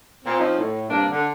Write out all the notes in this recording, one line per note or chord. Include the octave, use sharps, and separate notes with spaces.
A#2 C4
F3 C4 C#4 D#4
A2
G2 C3 A#3 D4
D3